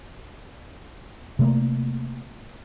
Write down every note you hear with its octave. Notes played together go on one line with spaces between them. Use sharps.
C3 A3 A#3